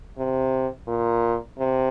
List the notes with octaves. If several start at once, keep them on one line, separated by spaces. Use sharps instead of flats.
C3
A#2
C3